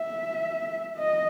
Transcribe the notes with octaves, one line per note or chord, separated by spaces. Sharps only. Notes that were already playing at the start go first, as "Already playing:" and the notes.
Already playing: E5
D#5